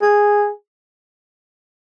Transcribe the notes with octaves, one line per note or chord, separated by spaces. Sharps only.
G#4